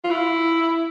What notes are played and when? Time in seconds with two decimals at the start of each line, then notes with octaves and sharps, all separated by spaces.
0.04 F4
0.10 E4